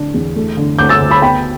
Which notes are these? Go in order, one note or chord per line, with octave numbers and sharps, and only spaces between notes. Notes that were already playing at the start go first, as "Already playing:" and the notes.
Already playing: A2 D3 D4
E2
A3
D3
D2 D6 G6
E6 A6
D2
B5 E6
B3 G5 B5